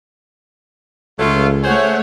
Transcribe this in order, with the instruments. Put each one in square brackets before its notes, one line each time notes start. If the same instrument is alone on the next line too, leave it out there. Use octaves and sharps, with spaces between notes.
[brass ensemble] C#2 [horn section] F#3 A3 F4
[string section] A3 C#5 [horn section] G#4 C5 F#5